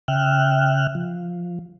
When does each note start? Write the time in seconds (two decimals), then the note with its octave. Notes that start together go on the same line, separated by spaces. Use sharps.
0.08 C#3 E5 G5 F6 F#6
0.95 F3